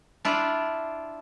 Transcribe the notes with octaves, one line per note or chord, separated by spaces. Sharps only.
D4 E4 F4 D5